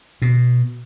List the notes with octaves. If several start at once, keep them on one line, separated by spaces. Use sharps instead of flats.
B2